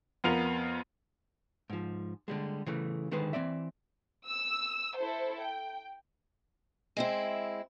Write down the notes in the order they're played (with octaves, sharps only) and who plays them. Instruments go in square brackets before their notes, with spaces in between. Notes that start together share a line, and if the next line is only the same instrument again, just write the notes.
[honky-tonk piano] F2 B3 F4 A#4 F7
[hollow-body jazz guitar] G#2 F3
D3 G3 G#3
C#3 E3 A3
D3 D#3 G#3 B4 C5
E3 F#3 C4 D5 E5
[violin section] E6
E4 A4 C5
G5
[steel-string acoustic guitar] G#3 C4 E4